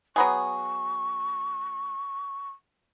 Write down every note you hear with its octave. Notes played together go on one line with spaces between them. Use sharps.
F#3 B3 G#4 C#6